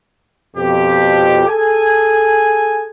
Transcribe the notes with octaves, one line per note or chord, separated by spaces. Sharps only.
F2 B2 G4
G#4 A4 G#5